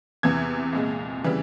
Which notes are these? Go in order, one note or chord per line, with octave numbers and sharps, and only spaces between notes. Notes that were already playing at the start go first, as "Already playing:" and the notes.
E2 C3 E3 G#6
C2 A#2 G#3
C#3 E3 G3